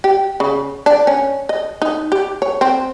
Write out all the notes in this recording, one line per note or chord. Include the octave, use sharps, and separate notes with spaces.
G4
C#3
D4
C#4
D#5
D#4
G4
C#5
C4